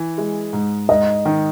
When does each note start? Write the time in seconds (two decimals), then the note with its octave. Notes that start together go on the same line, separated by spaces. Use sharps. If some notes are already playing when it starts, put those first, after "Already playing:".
Already playing: E3
0.18 G#3
0.53 G#2
0.89 G#2 D#5
1.25 D#3